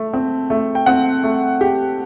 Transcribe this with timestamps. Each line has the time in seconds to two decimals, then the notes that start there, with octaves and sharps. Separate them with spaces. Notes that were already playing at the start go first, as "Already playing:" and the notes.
Already playing: A3
0.13 C4
0.50 A3
0.75 G5
0.86 C4 F#5
1.24 A3
1.61 G4